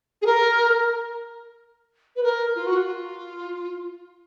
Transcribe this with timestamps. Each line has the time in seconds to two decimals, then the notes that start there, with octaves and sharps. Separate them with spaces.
0.21 G#4
0.26 A#4
2.15 B4
2.23 A#4
2.55 F4
2.66 F#4
2.76 F4